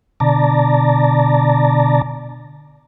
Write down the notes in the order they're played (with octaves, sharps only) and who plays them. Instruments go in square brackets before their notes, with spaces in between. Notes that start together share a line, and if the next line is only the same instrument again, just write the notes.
[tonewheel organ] B2 D3 D5 A5 A#5